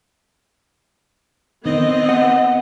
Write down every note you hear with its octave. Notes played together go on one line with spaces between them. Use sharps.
D#3 B3 C4 D#5
F#5